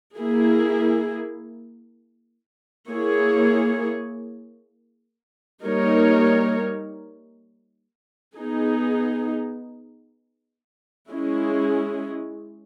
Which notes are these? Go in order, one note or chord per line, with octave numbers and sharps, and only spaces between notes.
A#3 E4 G#4
A#3 E4 G#4 C#5
G3 A#3 D#4 A#4 C#5
B3 D#4 G#4
G#3 C#4 E4 G#4